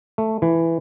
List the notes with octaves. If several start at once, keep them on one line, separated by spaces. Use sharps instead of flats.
A3
E3